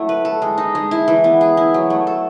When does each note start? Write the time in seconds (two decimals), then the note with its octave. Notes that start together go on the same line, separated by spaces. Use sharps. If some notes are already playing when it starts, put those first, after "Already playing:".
Already playing: F#3 A3 E4
0.09 B4
0.25 A4
0.42 G#3
0.58 D#4
0.75 G#3
0.91 E4
1.08 E3
1.24 B3
1.41 G#4
1.57 E4
1.74 F#3
1.90 A3
2.07 A4